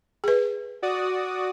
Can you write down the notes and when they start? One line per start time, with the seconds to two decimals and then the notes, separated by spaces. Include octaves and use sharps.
0.24 G#4 B4
0.82 F#4 D5 D#6